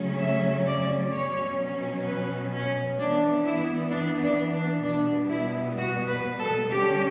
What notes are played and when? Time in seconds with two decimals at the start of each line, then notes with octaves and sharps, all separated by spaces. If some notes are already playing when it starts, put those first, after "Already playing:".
Already playing: C#3 F#3 A3 C#4
0.20 E5
0.66 D5
1.12 B2 F#3 C#4 C#5
2.05 B4
2.52 C#4
2.98 E3 B3 D4
3.45 E4
3.91 D4
4.22 D4
4.53 D4
4.84 B2 G3 B3 D4
5.30 E4
5.77 F#4
6.08 B4
6.39 A4
6.70 D3 G3 C#4 G4